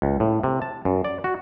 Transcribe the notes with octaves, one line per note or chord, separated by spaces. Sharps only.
C#2
A2
C3
A5
F#2
D5
F#4